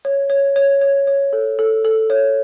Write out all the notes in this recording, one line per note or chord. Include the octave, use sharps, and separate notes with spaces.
C#5
C#5
C#5
C#5
C#5
A4
A4
A4
C#5